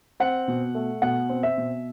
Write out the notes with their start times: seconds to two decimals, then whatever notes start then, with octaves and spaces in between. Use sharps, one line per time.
0.20 C4 F#5
0.48 B2
0.75 A3
1.02 B2 F#5
1.29 C4
1.43 E5
1.57 B2